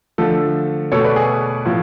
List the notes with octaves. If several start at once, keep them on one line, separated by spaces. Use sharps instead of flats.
D3 F3 A3 A4
B2 A3 A4 C#5
B4 D5
G#4
A2 F3